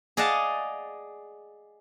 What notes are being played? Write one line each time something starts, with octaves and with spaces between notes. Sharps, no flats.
G#4 D5 D#5 F5 F#5 A5